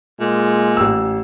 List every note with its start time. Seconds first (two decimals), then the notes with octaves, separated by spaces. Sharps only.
0.20 A#2 G#3
0.77 A1 E6